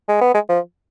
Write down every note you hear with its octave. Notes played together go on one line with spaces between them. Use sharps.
G#3
B3
G#3
F3